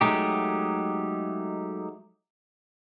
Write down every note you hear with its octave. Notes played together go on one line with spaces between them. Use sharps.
F#3 G#3 A3 D#4 G4